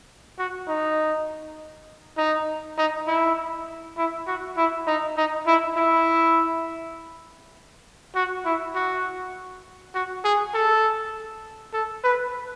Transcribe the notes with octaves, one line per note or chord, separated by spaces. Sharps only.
F#4
D#4
D#4
D#4
E4
E4
F#4
E4
D#4
D#4
E4
E4
F#4
E4
F#4
F#4
G#4
A4
A4
B4